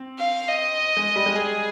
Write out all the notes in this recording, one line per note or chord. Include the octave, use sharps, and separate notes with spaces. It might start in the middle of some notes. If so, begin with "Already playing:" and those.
Already playing: C4
F5
D#5
G#3
G3
G#3
G3 G#4